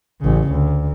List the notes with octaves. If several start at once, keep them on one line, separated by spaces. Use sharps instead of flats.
A1 C#3
D2